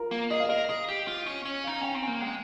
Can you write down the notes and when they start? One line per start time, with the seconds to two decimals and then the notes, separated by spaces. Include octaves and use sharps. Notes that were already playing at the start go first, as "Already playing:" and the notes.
Already playing: F4 A#4
0.11 A#3
0.31 G#4 D#5
0.40 F5
0.49 A#4 D#5
0.70 G#4
0.89 G4
1.08 F4
1.26 C#4
1.45 C#4
1.64 D#4 F5
1.81 C#4 G5
1.95 C4
2.03 A#3 G#5
2.21 G#3 G5